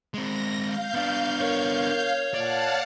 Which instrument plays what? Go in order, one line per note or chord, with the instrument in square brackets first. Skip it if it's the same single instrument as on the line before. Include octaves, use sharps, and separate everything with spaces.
[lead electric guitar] G#3 C4 [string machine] A#6
[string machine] F5 G6
[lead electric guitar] B3 D4
[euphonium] A#4 [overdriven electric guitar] C#5
[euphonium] A#2 [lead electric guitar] D5 [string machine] F5 F#5 A5